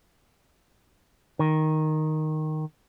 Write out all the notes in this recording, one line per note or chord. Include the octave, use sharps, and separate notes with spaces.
D#3